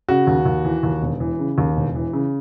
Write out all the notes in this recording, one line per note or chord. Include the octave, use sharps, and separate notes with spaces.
C#3 F#4
D#2
D#2
E3
D#2
E1
E3
C#3
D#2
E1
E3
C#3